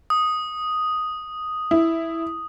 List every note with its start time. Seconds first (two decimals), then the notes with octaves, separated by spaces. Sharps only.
0.10 D#6
1.71 E4